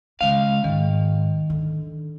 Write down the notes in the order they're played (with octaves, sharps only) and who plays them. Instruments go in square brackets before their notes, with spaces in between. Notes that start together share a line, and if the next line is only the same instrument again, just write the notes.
[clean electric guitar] C#2 F5 [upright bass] D#3
[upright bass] G#2 [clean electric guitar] D#3
[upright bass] D3